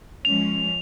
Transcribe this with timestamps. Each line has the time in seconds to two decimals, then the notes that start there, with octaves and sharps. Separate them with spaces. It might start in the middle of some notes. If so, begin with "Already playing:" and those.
0.25 F3 G#3 C#4 F7